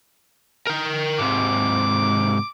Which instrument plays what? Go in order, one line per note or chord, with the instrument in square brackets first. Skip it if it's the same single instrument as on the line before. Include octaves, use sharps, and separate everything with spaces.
[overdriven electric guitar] A#4 G5
[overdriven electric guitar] G#2 C3 [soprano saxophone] D6